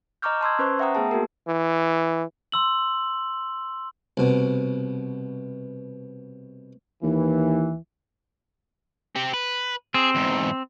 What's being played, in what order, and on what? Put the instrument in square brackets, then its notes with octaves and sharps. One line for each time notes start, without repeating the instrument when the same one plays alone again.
[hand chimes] D#5 A#5 C#6 D6 F6 G6
A5 C6 E6 G#6
C#4 B4 C5 C#6
E5 F#5 G5 A#5 D#6
A3 B3 G#4 A5
A#3 F#4 G#4 A#4
[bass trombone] E3
[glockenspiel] C6 E6 F#7
[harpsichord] C2 B2
[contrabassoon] D#2 [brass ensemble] E3
[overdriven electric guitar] C4 G4
B4
[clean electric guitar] C4 [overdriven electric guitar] G#4
[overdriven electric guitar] E2 G#2